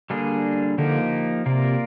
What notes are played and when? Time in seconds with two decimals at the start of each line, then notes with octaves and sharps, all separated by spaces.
0.10 D3 G3 A#3 D4 G#4
0.78 D3 F3 A#3 D#4 G4
1.46 C3 A#3 F4 A#4 D5